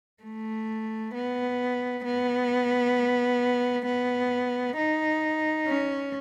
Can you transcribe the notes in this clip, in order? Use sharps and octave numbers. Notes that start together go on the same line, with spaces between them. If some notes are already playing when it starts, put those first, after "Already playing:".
A3
B3
B3
B3
D#4
C#4